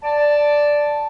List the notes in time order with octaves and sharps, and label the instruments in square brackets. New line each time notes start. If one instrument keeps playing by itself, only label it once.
[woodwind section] D5 A5